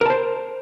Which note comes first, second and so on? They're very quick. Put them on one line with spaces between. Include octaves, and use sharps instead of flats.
A#4 A5 C5